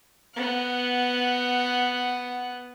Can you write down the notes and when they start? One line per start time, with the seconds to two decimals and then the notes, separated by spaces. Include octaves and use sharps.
0.34 B3 F#5